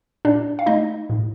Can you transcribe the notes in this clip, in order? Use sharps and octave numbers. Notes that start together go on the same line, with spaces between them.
A#2 D4 D5
F5
A3 D#4 D#5
A2